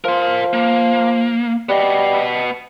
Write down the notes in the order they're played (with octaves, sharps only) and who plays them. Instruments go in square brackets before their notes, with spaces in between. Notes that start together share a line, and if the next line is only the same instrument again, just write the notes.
[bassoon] F3 [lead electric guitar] A#4 C6
[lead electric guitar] A#3
[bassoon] G3 [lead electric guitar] B3 D#5